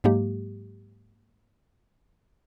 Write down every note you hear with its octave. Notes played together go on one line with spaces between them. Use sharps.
G#2 F#3 G#3 A#3 G4